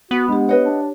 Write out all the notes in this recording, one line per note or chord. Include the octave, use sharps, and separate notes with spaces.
B3 F#4
G#3 D4 G4
B4 C#5 D#5 F#5
D4